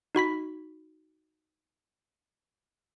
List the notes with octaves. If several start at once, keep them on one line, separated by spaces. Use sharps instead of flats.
D#4 F#4 B5 B6